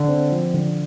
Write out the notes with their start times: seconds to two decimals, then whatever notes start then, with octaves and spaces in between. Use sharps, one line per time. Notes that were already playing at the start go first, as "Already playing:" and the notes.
Already playing: D3
0.08 C4
0.31 F3
0.54 D3